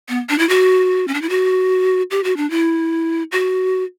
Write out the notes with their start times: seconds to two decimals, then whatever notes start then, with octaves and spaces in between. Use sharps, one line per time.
0.09 B3
0.29 D4
0.39 E4
0.49 F#4
1.08 C#4
1.14 D4
1.22 E4
1.30 F#4
2.11 G4
2.24 F#4
2.37 D4
2.50 E4
3.32 F#4